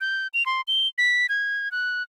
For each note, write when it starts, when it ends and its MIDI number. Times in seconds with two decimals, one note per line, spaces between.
0.01 0.27 91
0.34 0.45 101
0.46 0.61 84
0.68 0.88 103
0.98 1.27 95
1.29 1.71 92
1.71 2.03 90